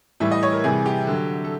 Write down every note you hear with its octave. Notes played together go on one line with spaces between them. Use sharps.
A2 E3 G3 E5
D#5
C#5
A#4
C3 E3 G3 G#4
G4
D3 F#3
A4